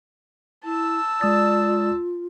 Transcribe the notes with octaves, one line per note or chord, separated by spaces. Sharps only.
E4 A5 E6
G#3 F4 D5 D#6 A6